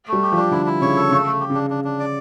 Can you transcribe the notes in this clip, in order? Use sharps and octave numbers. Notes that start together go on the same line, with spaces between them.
G3 A3
G4
F3
D4
D3 E4
E4
C#3 C#5
A4
C#3 A3
A3
G4
C#3 D4
D4
D4
D5